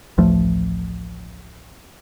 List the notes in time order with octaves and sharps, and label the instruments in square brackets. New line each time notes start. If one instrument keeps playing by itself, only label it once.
[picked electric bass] A1 D2 F3 A3